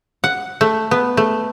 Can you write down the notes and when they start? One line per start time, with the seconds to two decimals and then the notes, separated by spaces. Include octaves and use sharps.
0.24 F#5
0.61 A3
0.91 B3
1.17 A3